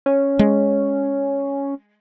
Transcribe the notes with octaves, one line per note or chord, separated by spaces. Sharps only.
C#4
G#3